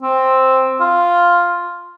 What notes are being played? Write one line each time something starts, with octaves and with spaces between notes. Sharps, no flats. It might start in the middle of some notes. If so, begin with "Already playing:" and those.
C4
F4